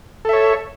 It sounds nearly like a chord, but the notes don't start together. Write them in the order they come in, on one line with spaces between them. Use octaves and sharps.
A4 E5 C#5